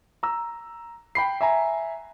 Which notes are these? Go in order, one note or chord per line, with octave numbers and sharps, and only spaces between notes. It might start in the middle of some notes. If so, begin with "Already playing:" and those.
A#5 E6
G5 B5 C7
E5 G#5 A#5